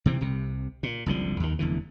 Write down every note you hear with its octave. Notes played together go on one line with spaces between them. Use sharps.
C3 E3 C4
C2 C3
A#2
F#1 C2 D3 F3
D#2 D#3
F1 E2 D3 E3